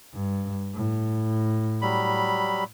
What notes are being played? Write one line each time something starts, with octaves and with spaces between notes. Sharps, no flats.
G2
A2
F#3 G3 B5